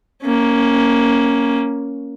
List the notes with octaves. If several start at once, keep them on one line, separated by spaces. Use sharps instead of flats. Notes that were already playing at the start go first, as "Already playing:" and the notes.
A#3 C#4